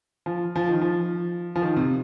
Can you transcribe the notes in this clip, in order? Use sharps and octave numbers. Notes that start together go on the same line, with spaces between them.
F3
F3
D#3
F3
F3
D#3
C3